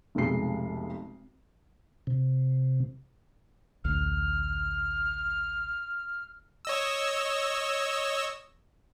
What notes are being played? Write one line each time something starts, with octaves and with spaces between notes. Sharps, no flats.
F1 B1 C3 G#3 C7
C3
A1 D2 F6
C#5 D#5 E6